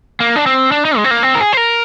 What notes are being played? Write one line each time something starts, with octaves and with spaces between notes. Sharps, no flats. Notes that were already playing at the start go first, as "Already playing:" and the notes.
A#3
D4
C4
D4
D#4
G#3
C4
A#3
C4
A#4
G#4
C5
A#4